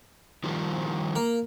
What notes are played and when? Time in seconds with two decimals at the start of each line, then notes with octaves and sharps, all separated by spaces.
0.44 D#3 F3 G3
1.16 A#3